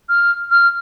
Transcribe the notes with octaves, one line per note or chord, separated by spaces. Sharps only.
F6
F6